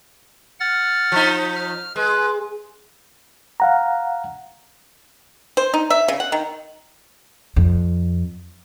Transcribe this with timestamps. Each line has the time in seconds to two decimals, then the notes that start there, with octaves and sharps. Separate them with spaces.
0.60 F#5 F6 A6
1.12 F3 D#4
1.56 F6
1.96 G#3 B4
3.60 F5 F#5 A#5
5.57 C5
5.74 D#4
5.90 E5
6.08 C#3
6.20 F#5
6.32 D#3
7.56 F2